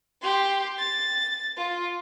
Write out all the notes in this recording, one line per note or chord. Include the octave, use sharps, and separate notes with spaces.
G4 C6
A6
F4